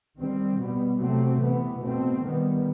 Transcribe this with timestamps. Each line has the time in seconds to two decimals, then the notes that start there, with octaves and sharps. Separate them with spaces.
0.18 D#3 G3 C4
0.58 B2 G3 B3
1.00 C3 F#3 A3 C4
1.40 C3 E3 B3
1.80 B2 A3 C4
2.21 D#3 G3 B3